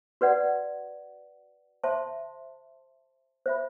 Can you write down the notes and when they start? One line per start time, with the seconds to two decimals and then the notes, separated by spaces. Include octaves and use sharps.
0.21 F#4 B4 D5 F#5
1.84 C5 E5 A5 C6
3.46 C5 E5 B5